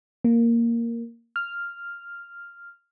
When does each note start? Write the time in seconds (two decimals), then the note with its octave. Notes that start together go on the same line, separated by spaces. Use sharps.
0.24 A#3
1.36 F6